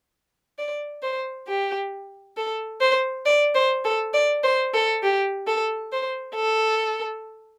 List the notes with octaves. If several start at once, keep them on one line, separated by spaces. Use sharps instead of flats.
D5
C5
G4
A4
C5
D5
C5
A4
D5
C5
A4
G4
A4
C5
A4